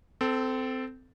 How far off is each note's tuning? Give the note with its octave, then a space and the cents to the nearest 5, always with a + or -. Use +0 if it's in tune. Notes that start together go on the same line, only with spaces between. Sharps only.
C4 -20 A4 +0